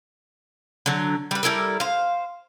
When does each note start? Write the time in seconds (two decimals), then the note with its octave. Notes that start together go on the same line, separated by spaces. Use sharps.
0.86 D3 F#3
1.31 G3 B4
1.43 G3 E4 A4 A#4
1.80 C5 F5